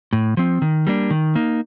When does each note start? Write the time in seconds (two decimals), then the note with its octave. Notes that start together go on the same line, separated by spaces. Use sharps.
0.13 A2
0.37 F3 C4
0.62 D#3
0.87 G3 A#3 D4
1.10 D#3
1.35 A#3 D#4